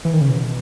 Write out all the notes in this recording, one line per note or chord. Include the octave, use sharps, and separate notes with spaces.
E3
D#3
C#3
B2